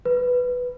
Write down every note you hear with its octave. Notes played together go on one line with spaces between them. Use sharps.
B4